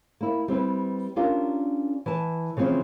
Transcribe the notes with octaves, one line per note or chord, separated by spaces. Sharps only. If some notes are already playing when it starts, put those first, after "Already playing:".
A#3 E4
G3 C4 E4 B4
C#4 D4 F4 G4 A#4
E3 A5
C#3 E3 F3 C4 C#4